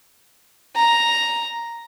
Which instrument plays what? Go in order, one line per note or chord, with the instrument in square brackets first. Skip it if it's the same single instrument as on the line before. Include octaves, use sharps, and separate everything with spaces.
[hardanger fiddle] A#5